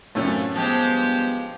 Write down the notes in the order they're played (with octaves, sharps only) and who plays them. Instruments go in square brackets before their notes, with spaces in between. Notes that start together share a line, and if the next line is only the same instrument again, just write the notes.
[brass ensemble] A1 [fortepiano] F#2 A2 A3 [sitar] C4 C#4 F4
[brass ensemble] G2 B3 [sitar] F3 G#3 [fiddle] G4 C5